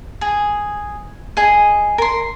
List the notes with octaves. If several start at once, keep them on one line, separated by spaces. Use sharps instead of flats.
G#4
G#4 D#5
A#4 C6